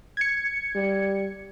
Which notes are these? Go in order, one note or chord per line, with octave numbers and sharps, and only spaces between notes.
G#6 C#7
G3